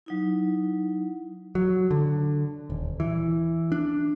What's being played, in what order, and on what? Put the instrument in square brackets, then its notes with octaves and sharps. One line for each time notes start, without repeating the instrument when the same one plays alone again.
[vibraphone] F#3 D#4 E4
[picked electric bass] F#3
D3
D#1
E3
D4